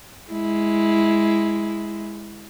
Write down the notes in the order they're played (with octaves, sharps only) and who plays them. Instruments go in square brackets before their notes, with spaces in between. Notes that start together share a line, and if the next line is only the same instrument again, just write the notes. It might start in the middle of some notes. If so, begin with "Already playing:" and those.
[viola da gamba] G#3 E4